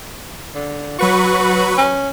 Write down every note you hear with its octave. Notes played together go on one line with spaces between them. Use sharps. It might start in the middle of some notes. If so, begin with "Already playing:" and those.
D3
F#3 F#4 B4 C#6
C#4